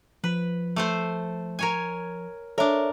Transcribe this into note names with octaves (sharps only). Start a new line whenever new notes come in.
F3 B4
A3 A4 C5
A#4 C#5 G#5
D4 A4 A#4 C#5 E5